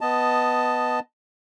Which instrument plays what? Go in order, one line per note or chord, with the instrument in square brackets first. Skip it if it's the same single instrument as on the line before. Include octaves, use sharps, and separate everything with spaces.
[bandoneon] B3 D#5 A5